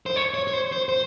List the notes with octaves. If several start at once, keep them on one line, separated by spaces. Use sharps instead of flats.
C5
C#5
C#5
C#5
C5
C5
C5